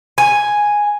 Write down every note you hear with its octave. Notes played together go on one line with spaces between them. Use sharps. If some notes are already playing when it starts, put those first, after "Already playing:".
G#5